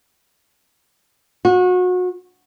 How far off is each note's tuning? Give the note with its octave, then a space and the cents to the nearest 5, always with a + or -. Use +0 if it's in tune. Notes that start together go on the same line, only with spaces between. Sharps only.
F#4 -30